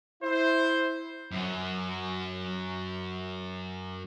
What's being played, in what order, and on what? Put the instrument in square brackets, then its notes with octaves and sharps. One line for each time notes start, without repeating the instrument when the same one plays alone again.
[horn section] E4 C5
[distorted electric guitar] F#2 F#3